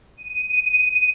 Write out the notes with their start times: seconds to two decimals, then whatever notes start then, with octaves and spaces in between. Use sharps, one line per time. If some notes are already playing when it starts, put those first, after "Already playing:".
0.17 D#7